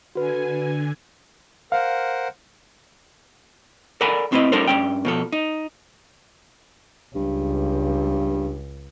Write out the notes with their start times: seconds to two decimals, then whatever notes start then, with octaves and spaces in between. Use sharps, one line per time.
0.15 D3 F#4 B4 G#5
1.72 A#4 C5 F5 F#5
4.01 A4 A#4 D5 F#5 G#5 B5
4.32 A2 C4 E4 B4 D#5
4.52 G3 C#4 D#4 A4 A#4 C5
4.67 G2 C#4 G5
5.05 B2 F3 A4
5.32 D#4
7.15 C#2 G2